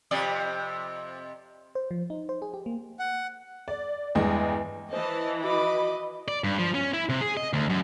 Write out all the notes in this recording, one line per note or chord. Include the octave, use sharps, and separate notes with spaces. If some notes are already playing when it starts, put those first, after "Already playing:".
F2 C3 D5
C5
F3
D#4
C5
G#4
G4
A#3
F#5
D5
E2 G2 G#3 D#5 G5
E3 C5 D#5 A5
F#4 D#5 B5 D6
D5
G2
F3
C#4
E4
C3
G#4
D#5
D2
F#2